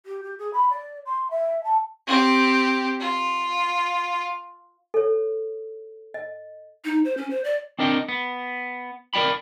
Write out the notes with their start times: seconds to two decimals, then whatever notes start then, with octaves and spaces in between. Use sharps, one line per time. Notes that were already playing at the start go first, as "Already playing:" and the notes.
0.06 G4
0.23 G4
0.38 G#4
0.53 B5
0.70 D5
1.06 C6
1.30 E5
1.63 A5
2.07 C4 G4
3.00 F4
4.94 A4 C#5
6.14 D#5
6.85 D#4
7.05 C5
7.17 C#4
7.30 C5
7.44 D5
7.79 C4 D4 A#4 D#5 G5
8.09 B3
9.14 A#4 B4 D5 G5 B5